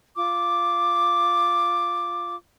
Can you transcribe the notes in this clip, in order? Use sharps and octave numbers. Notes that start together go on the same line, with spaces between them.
F4 D6